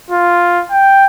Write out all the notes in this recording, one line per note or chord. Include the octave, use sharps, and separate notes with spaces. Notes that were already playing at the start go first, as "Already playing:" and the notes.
F4
G5